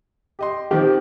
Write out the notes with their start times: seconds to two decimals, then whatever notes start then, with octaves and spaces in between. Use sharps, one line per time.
0.39 G4 D#5 C6
0.71 D#3 F3 C4 G4